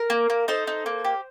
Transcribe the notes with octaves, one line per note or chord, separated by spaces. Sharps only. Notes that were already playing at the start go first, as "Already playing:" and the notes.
Already playing: A#4
A#3
A#3
D#4 A4 C5
D#4
A#3
G4